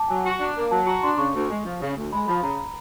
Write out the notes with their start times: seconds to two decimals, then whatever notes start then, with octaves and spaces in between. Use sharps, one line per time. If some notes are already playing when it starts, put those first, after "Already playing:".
Already playing: A5 D6
0.08 F#3 G#5
0.24 F#4
0.40 D4
0.56 A#3
0.71 F#3 A5
0.87 F#4 A#5
1.03 D4 C6
1.18 C#3 C#6
1.34 D2
1.50 G#3
1.65 F3
1.81 C#3
1.96 D2
2.12 G#3 B5
2.28 F3 B5
2.43 C#3 A#5